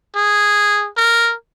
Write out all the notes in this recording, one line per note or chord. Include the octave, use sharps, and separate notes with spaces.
G#4
A#4